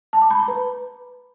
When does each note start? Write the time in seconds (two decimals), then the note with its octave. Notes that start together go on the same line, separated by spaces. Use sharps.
0.13 A5
0.22 D6
0.31 B5
0.39 A#5
0.48 B4